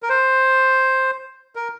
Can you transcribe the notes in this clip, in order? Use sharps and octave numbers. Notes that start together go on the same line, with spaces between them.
A#4
C5
A#4